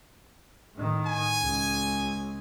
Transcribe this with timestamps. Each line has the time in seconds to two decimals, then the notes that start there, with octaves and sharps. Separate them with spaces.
0.75 A2 D#3
1.06 G#5
1.41 C#2